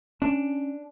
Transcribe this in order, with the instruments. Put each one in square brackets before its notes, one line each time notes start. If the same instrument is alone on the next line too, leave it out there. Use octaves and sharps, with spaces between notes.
[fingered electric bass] C#4 [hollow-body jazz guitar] D4